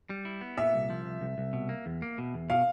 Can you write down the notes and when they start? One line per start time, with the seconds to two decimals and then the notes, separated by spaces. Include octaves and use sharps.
0.10 G3
0.25 E4
0.41 B3
0.57 A#2 E5
0.74 C2
0.90 F3
1.06 C2
1.21 C2
1.38 C2
1.53 B2
1.69 A#3
1.86 E2
2.02 A#3
2.18 B2
2.34 E2
2.50 B2 F5